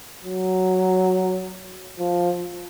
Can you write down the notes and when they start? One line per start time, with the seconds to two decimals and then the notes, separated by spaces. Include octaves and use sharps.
0.24 F#3
1.98 F3